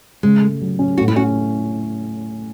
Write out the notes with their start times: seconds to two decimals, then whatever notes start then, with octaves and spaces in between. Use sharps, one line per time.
0.23 C#3 G#3
0.42 A3
0.61 F#3
0.79 C#4
0.98 A2 F#4
1.08 E4
1.16 C#4 F#4